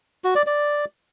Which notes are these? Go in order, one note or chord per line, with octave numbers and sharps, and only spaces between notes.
F#4
D5
D5